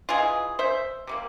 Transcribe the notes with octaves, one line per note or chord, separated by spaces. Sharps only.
E3 G#3 F4 G#4
C5 E5
C3 G3 A#3